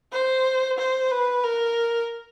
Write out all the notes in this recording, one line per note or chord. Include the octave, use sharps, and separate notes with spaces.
C5
C5
B4
A#4